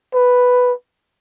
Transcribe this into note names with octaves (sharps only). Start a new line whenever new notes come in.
B4